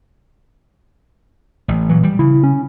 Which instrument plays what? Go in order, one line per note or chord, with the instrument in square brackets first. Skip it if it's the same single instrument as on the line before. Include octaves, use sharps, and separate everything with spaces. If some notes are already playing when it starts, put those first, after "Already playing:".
[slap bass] A1
[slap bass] A#2 F#3 [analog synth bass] E3
[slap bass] G3
[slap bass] C#3 [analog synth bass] E4
[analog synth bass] C#4